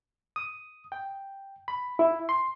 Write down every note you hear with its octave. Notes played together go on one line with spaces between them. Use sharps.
D#6
G5
B5
E4
C6